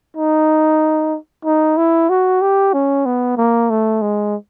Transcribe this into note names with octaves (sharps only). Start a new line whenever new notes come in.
D#4
D#4
E4
F#4
G4
C#4
B3
A#3
A3
G#3